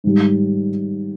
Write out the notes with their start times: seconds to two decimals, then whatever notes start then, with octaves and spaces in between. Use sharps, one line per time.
0.04 G#2 D#3 G3